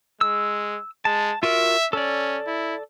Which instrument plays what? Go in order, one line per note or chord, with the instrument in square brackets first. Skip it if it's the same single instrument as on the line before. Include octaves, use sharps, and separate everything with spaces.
[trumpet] G#3 [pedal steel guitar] E6
[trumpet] G#3 [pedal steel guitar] A5
[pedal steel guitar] F4 F#4 A#4 [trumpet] E5
[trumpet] C#4 [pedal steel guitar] A4 D5
[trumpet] E4